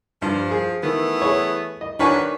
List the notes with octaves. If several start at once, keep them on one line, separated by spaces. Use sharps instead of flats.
G2 F3
G#4
D#3 E3 A3 B3
G#4 C#5
D#5
D#3 D4 F#4 B4 C#5 G#5